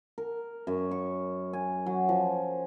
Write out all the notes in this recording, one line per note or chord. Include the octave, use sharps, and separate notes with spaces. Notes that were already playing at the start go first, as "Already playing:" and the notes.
A#4
F#2
C#6
G#5
F#3
F3